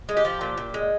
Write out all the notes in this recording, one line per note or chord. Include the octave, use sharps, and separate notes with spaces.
G#3
G4
F3
A#2
A#2
G#3